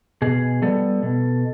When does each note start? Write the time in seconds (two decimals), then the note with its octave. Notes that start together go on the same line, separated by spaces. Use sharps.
0.22 B2 G#4
0.62 G3 B3 A4
1.03 B2